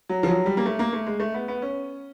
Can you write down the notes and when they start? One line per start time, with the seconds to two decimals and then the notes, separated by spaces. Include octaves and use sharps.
0.09 F#3
0.23 F3
0.28 F#3
0.46 G3
0.57 A#3
0.65 A3
0.79 A#3
0.93 A3
1.07 G#3
1.20 A3
1.34 B3
1.48 B3
1.62 C#4